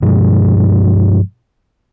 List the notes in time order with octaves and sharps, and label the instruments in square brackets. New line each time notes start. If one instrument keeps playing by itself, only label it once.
[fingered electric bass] G2 B2 F3 G#3